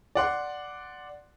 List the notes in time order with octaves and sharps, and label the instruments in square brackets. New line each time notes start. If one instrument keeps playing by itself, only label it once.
[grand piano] D5 F#5 C6